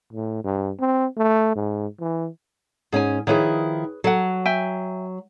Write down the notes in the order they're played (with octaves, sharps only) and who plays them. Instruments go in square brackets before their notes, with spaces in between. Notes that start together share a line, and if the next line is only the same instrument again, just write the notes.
[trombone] A2
G2
C4
A3
G#2
E3
[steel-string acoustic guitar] G#2 C#4 [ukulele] G#4 G#5
[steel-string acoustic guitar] D#3 F3 E4 [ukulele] G#4 B4 C#5
[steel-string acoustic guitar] F#3 [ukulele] A4 F#5
[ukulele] E5 G5 G#5